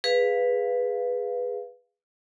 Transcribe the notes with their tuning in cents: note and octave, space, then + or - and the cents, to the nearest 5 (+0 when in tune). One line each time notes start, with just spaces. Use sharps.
G#4 -10 B4 +0 F5 +0